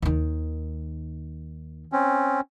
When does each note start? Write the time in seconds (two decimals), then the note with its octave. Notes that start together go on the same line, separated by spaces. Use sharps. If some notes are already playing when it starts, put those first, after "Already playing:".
0.02 D#2 D#3
1.92 C4 C#4